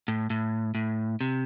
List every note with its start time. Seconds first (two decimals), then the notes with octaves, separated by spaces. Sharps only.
0.08 A2
0.30 A2
0.75 A2
1.21 C3